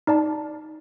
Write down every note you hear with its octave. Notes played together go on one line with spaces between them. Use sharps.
D#4 D5 A5